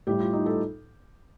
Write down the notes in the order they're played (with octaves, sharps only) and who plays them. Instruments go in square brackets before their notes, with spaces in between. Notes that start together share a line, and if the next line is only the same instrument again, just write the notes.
[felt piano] A2 G3 G4
F4
D#4
A4